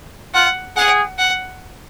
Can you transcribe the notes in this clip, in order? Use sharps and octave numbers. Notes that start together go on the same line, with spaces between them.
F4 F#5
G#4 F#5
F#5